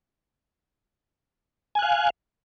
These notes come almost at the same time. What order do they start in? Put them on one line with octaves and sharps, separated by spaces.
G#5 F#6 F5